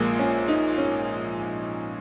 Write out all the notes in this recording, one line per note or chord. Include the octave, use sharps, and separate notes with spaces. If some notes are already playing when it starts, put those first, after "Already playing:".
Already playing: A#1 A#2 F3 G#3 A#3
C#4
D#4
C#4